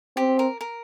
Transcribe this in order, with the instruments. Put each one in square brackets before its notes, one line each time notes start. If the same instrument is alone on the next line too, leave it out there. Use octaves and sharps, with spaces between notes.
[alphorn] C4 [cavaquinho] G4
[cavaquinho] A#4
A#4